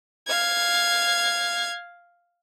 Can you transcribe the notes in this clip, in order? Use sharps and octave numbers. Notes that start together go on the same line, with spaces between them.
F5 G#6